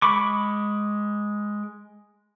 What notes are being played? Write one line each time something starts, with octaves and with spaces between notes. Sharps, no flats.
G#3 B5 C#6 D6